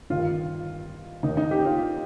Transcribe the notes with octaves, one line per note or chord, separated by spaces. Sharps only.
G1 G2 D#3 F4
D#2 D#3 D#4
D#4
G4
F4